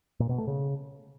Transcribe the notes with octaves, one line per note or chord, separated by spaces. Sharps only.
A#2
B2
A3
C#3